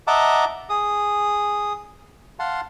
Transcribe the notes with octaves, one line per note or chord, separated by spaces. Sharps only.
D#5 E5 F#5 A5 A#5 D6
G#4 D#6
F5 F#5 A5 C6